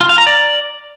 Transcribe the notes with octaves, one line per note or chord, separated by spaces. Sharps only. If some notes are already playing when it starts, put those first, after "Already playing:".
F4
F5
A#5
D5